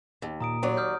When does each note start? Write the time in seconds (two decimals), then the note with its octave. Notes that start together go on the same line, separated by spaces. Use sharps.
0.22 D#2
0.40 A#2 A#5 D#6 D7
0.63 D#2 F#3 D5
0.77 D#6 F6 G6